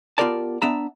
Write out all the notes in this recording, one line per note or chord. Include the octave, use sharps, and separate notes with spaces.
B3 F4 G4 A#4 D5 A5
B3 D4 E5 A#5